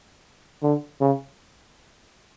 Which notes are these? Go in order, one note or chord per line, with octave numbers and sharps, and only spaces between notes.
D3
C#3